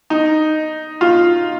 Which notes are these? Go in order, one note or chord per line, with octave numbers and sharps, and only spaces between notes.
D#4
F4